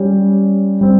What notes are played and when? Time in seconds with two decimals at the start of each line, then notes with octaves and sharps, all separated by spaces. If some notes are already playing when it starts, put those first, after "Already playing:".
Already playing: G3 C#4 G4
0.81 G3 C4